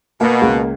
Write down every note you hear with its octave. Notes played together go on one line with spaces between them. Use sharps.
B2 A#3
C#2